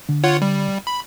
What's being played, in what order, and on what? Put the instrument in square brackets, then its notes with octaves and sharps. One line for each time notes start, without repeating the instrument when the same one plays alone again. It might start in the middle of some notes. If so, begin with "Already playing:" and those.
[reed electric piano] D3
[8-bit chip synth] F4 C#5 F#5
G3
B5